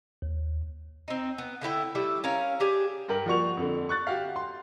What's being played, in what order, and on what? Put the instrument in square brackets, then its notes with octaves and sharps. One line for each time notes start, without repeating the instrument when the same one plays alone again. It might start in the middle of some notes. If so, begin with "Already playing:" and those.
[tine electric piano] D#2
[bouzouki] C4 D#4
B3
D3 A3 E4 G5
G3 A3 D4 E4
C#4 A#4 F5
D4 G4 G#4
[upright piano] G2 G4 A#4 F#7
F3 A#3 F#4 D5 C#6 F7
F2 D3
C#6 F#6 A6
F#4 G4 F5
C6